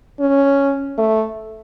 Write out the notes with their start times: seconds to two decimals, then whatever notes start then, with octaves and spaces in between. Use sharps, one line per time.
0.20 C#4
0.98 A3